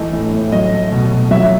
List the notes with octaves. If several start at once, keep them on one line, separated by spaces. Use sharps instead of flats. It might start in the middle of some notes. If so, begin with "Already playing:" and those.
Already playing: E3 A3 D#5
A2
A2
F#3 D#5
A3
B2
B2
F#3 E5